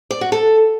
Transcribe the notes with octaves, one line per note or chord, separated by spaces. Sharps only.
D5
F#4
A4